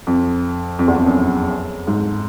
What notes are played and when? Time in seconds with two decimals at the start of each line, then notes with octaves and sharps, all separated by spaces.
0.07 F2
0.79 F2
0.88 E2
0.97 F2
1.06 F#2
1.87 G#2